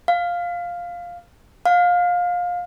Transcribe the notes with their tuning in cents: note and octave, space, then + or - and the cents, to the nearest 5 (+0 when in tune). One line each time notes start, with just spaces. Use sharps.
F5 +5
F5 +25